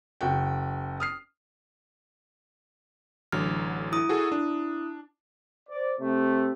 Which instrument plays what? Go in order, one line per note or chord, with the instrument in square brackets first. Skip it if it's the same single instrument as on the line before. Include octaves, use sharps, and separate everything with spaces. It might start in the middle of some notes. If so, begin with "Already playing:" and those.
[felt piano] F#1 F#4 G5
D#6 F6 C7
[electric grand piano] A1 D3 F#3 [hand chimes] F6
[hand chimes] E4 D#6
[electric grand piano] F#4 G#4 A4
D4
[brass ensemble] C5 D5
C3 A3